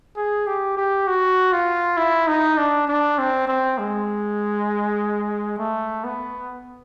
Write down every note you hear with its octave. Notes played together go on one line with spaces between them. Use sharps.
G#4
G4
G4
F#4
F4
E4
D#4
D4
D4
C4
C4
G#3
A3
B3